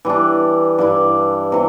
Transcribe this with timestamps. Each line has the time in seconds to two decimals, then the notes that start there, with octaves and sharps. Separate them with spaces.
0.05 E3 G3 D4
0.79 G2 G3 E4
1.52 C3 E3